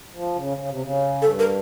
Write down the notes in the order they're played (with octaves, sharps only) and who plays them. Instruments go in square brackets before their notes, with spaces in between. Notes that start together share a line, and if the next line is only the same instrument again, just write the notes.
[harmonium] F3
C#3
C#3
C3
C#3
[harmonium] G2 [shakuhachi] A4
[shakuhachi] A#4